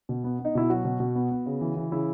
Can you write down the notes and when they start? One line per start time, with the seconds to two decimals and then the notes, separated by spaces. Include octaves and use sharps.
0.09 B2
0.24 B3
0.39 B3
0.45 D#4
0.55 B2 E4
0.70 F#3 F#4
0.84 B2
1.00 B2
1.15 B3
1.31 B3
1.46 C#3
1.61 E3
1.76 E3
1.92 C#3 E4